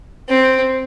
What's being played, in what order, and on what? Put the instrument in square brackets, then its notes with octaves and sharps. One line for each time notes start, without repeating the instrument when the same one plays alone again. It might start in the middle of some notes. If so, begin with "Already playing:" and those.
[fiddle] C4